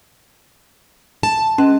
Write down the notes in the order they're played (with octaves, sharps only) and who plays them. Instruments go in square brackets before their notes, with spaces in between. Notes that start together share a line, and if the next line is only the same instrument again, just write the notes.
[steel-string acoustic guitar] A5
[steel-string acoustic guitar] G#3 [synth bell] C#4